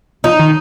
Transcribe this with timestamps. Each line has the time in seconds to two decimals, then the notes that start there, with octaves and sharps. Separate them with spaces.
0.24 F3 D#4
0.39 D#3